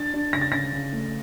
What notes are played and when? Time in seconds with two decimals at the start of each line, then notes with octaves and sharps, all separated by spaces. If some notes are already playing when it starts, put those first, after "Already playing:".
Already playing: D4 A6
0.13 D4
0.33 C#3 A#6
0.41 A6
0.52 C#3 A#6
0.72 C#3
0.93 A3